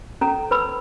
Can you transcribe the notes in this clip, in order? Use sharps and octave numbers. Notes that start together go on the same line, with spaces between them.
C#4 A4 A#5
B4 B5 E6